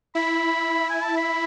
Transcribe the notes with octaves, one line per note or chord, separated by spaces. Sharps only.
E4 B5
G#5
A5
B5